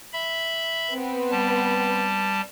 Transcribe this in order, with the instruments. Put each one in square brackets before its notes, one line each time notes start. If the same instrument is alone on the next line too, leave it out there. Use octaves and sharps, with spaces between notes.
[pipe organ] E5 B5
[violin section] B3 C4 B4
[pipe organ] G3 A5